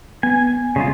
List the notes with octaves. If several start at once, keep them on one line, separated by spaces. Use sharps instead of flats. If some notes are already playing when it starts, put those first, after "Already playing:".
B3 G#5
C#3 G#3 F4